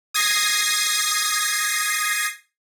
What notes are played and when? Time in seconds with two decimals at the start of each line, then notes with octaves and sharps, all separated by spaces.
0.14 D#6 G#6 A#6 C7